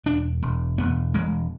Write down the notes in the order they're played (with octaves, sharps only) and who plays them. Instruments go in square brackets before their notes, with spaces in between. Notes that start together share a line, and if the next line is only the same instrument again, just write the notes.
[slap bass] E1 D4
E1
E1 B3
E1 G#3